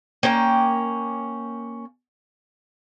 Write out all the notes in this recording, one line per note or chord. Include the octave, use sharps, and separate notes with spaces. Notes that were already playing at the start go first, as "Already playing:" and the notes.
A#3 C#4 G5